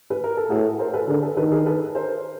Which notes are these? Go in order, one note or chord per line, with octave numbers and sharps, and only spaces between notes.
B4
A#4
A4
A2 F#4 G#4
A#4 C5
A4 B4
D3 G#4 A#4
A4 B4
D#3 A4 B4
G#4 A#4
A4 B4
A#4 C5